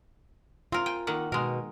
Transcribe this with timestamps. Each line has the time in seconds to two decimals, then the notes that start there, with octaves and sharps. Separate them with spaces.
0.72 C4 F4 A#4
0.86 G5 G#5
1.07 D#3 A#3 F#5
1.32 B2 G#3 A#4